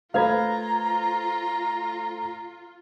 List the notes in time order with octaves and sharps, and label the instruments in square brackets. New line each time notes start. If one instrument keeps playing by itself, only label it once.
[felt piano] A3 C5 G#6 [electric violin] F4 [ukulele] B4 F5 [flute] A#5